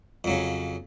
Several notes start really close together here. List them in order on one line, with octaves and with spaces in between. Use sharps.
F2 F#3 C#3